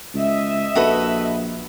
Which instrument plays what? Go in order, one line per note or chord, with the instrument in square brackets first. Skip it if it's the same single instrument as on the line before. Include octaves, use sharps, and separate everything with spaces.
[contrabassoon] C#2 [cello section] D#5 E5
[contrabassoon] A#1 [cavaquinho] F#4 A4 B4